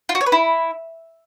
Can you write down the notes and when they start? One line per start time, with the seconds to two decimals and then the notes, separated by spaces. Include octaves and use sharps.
0.09 F4
0.15 F#4
0.21 C#5
0.26 B4
0.32 E4